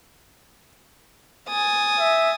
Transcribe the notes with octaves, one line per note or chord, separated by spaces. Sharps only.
G#5 D#6 A6
E5